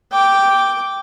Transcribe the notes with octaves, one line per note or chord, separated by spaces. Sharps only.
G5 D6